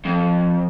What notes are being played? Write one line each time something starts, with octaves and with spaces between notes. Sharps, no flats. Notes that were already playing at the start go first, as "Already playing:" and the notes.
F2